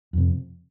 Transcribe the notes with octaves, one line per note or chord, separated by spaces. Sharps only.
F2 C3